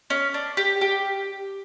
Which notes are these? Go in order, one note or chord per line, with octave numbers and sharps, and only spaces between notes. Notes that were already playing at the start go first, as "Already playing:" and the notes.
C#4
D4
G4
G4